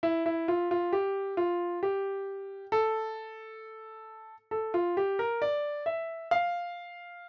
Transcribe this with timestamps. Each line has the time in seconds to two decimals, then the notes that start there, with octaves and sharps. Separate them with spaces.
0.03 E4
0.26 E4
0.48 F4
0.71 F4
0.93 G4
1.37 F4
1.83 G4
2.72 A4
4.51 A4
4.74 F4
4.97 G4
5.19 A#4
5.42 D5
5.86 E5
6.31 F5